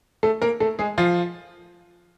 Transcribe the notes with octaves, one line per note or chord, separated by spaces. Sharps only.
A3 A4
A#3 A#4
A3 A4
G#3 G#4
F3 F4